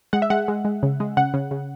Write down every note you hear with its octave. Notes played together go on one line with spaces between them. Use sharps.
G#3 F#5
E5
G#3 F#5
G#3
G#3
C#3
G#3
C#3 F#5
C#3
C#3